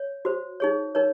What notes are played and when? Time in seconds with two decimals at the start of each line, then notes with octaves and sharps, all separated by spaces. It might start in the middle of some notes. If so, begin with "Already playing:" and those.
Already playing: C#5
0.25 F#4 C5
0.60 D#4 G#4 C#5
0.95 D#4 A#4 C#5